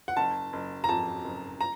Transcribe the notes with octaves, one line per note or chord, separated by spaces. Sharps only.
F#5
F#1 A5
F#1
A#5
F2 A5
F#1
A#5